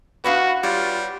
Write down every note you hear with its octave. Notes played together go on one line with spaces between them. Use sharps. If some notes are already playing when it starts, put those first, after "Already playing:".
B3 D4 E4 F#4 B4 F5
G3 F4 C#5